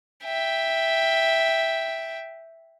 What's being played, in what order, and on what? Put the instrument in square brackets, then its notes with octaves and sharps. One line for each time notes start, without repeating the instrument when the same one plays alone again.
[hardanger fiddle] E5 G5